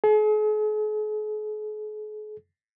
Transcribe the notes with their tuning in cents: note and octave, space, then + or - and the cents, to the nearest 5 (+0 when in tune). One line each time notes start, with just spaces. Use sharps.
G#4 +45